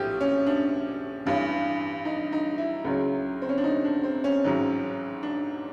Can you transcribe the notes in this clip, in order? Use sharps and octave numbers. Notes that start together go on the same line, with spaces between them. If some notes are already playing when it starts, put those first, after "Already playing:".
Already playing: A#1 A2 F3 G4
C#4
D4
A1 G2 E3
D#4
D#4
E4
C#2 C#3 F#3
C4
C#4
D4
D#4
D4
C4
C#4
A1 G#2 D#3 F#3
D4